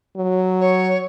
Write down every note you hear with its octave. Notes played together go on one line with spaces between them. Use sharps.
F#3
C#5